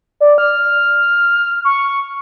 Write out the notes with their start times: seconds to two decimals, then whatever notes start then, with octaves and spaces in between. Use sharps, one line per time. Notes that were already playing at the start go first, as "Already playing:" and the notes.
0.21 D5
0.38 F6
1.65 C#6